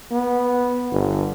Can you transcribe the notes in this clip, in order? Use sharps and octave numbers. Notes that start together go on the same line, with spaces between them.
B3
G1